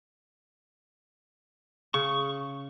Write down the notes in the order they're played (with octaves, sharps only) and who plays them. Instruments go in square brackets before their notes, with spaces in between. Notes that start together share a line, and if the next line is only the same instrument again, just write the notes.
[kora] C#3 [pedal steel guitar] C#6